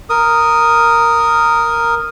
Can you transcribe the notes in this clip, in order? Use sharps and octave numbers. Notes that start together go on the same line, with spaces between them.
A#4 D#6